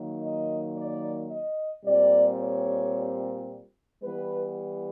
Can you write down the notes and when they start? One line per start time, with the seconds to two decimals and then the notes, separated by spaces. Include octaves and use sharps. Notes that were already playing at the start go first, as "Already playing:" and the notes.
Already playing: D#3 F#3 A#3
0.22 D#5
0.77 D5
1.31 D#5
1.85 A#2 G3 C4 D5
2.40 C#5
4.02 E3 G3 B3 B4